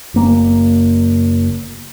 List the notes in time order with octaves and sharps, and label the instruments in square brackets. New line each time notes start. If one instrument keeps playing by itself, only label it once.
[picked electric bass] F#1 A#3